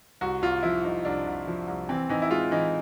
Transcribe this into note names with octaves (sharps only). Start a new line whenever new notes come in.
C2 F#4
C2 F4
F3 E4
C2 D#4
C2 D4
C2
F3
C2
E3 C4
E3 D#4
E4
G#3 F4
E3 D#4